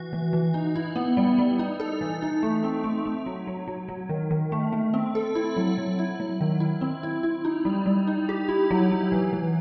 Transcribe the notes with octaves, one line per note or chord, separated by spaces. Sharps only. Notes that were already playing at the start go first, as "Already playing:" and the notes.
Already playing: E3 F#4
E3
E3
D#4
E4
B3
G3
G3
D#4
A4
E3
D#4
A3
C4
A3
A3
F#3
F#3
F#3
F#3
D#3
D#3
A3
A3
C4
A4
E4
F#3
F#3
E4
F#3
D#3
E4
C4
E4
E4
D#4
G3
G3
D#4
G4
E4
F#3
F#3
E3
E3